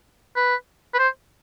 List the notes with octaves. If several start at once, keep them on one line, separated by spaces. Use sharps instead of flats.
B4
B4
C5